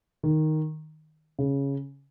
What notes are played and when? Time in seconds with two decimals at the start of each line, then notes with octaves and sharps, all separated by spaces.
0.23 D#3
1.39 C#3